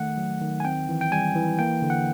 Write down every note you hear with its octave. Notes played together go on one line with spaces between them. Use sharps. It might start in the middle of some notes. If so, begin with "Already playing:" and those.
Already playing: D#3 A3 F#5
F#3
D#3
G#5
C4 G5
E3
G5
G3 G#5
E3
A#3 G5
D3
F#5